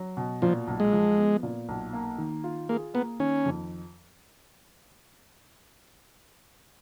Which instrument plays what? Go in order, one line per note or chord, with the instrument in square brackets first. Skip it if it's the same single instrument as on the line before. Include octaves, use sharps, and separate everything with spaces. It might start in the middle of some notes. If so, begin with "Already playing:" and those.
Already playing: [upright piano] F#3
B2
[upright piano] A#2 [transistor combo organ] F3
[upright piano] B1
[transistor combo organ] G#3
[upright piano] F3
B3
A#2
B1
A#3
D#3
F4
[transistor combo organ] A#3 [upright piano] G#4
[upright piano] A#3 [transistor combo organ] B3
[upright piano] D#3 [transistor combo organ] C#4
[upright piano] F2